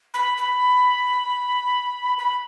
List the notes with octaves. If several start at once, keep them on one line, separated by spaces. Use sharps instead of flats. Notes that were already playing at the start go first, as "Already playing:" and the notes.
B5
B5
B5